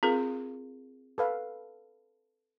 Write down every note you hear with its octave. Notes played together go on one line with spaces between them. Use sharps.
C4 F4 G#4 A#4
A4 B4 F5